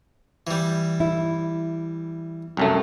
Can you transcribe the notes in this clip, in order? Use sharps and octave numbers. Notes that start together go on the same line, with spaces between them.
E3 G3
E4
C2 F#2 A3